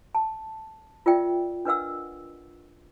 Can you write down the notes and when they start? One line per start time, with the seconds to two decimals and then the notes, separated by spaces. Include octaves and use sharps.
0.15 A5
1.06 F4 A#4 D5 E5 G5
1.65 D4 A#4 B4 D#5 F#5 E6